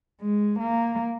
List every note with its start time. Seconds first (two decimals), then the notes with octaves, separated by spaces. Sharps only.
0.22 G#3
0.60 A#3